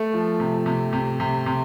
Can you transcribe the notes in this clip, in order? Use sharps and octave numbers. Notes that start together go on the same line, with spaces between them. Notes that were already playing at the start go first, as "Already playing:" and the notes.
Already playing: A3
F3
C3
C3
C3
C3
C3